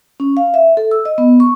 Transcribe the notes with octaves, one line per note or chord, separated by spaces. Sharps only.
C#4
F5
E5
A4
E6
D#5
B3
C#6